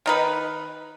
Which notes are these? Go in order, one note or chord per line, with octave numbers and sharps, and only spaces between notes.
D#3 D#4 B4